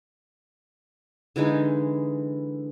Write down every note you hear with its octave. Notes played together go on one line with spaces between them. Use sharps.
D3 E3 G#3 D#4